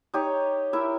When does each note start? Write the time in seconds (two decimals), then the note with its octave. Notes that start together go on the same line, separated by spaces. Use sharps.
0.14 D#4 G4 C#5
0.73 E4 A#4 E5